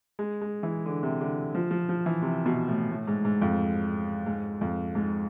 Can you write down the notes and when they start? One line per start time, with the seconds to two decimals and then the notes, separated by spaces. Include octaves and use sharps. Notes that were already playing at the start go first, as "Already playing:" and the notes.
0.19 G#3
0.41 G#3
0.63 E3
0.86 D3
1.03 C3
1.21 D3
1.55 F3
1.71 F3
1.89 F3
2.06 E3
2.22 C3
2.46 B2
2.68 A2
2.90 A2
3.07 G#2
3.25 G#2
3.42 F2
4.26 G#2
4.61 F2
4.95 G#2